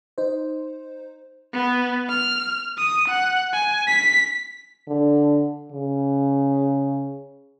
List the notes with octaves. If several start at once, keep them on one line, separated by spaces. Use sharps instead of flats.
D#4 C5
B3
F6
D#6
F#5
G#5
B6
D3
C#3